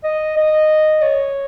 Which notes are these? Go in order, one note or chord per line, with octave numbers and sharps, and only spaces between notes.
D#5
D#5
C#5